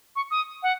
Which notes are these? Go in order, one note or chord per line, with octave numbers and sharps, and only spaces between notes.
C#6
D#6
F#5